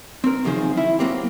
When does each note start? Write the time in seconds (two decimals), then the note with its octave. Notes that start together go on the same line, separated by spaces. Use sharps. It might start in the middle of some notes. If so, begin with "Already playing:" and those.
0.24 C4 A#4
0.44 C#2 F#2 D#3 F3 G#4 C5
0.77 E4 E5
0.99 F#3 A#3 C4 G4